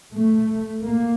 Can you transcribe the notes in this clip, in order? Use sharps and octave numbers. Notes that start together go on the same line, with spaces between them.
A3
A#3